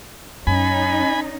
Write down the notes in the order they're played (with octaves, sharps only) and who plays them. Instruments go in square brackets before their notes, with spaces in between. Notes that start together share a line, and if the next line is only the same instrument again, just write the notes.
[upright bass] F#2 [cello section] C#4 D#4 [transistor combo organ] G#5 B5